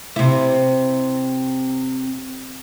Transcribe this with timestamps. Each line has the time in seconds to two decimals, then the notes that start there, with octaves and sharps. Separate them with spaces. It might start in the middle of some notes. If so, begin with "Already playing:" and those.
0.16 C3 E4